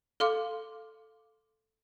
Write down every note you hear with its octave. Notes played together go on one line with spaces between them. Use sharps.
A4 F5 C6 D6